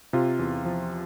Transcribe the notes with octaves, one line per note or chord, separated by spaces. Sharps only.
C3 F4
E2
F3